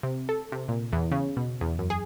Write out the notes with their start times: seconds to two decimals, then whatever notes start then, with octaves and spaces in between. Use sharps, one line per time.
0.03 C3
0.29 A4
0.52 C3
0.68 A#2
0.92 E2
1.12 C#3
1.37 B2
1.61 E2
1.79 F#2
1.90 G#4